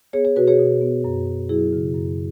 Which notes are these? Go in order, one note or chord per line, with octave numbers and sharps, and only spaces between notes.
B3 G#4 C#5
G#4 C#5
B2 F#4 B4
G#4 C#5
B2
B3
F#2
F#2
F#3 E4 G#4
C#3
F#2